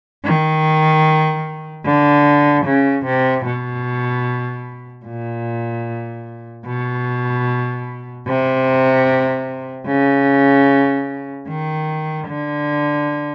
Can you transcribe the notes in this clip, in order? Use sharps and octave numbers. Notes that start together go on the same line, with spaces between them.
D#3
D3
C#3
C3
B2
A#2
B2
C3
C#3
D#3
D3